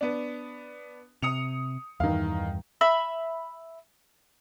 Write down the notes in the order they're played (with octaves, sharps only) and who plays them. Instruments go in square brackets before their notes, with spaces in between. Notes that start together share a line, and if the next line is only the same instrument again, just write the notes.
[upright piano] B3 D4
[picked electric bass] C3 [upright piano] D#6 C#7 F7
[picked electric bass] E2 G2 E3 [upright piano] D#3 F5
[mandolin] E5 B5 E6